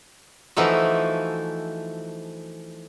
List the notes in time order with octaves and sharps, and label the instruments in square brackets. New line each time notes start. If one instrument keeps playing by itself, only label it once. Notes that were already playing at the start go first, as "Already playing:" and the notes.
[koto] E3 F3 A3 D#4 F#4 E5